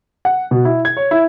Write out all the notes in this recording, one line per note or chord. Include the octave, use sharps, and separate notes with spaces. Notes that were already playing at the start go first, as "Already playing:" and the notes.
F#5
B2
E4
G#6
C#5
E4